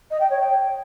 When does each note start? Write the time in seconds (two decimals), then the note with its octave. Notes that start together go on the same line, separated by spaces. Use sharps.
0.10 D#5
0.20 G5
0.30 C#5
0.39 G5